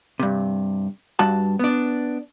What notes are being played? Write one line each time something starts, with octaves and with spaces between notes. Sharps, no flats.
G2 C3
G2 F#4 A5
B3 D4